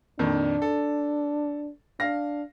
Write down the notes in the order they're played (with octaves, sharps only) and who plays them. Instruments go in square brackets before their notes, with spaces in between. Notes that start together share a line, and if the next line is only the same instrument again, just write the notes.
[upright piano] F2 A#2 D#3 [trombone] D4
[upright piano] A4
[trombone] D4 [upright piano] F5 A#6